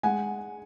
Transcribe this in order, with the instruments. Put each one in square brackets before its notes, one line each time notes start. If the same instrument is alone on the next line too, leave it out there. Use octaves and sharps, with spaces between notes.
[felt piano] G#3 F#5 G#5